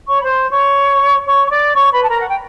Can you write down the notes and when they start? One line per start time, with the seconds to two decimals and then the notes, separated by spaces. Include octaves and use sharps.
0.08 C#5 C#6
0.21 B5
0.25 C5 C6
0.50 C#5 C#6
1.26 C#5 C#6
1.46 C#6
1.51 D5 D6
1.75 C#5 C#6
1.92 B4 B5
2.03 A5
2.08 A#4 A#5
2.20 F#5
2.28 G5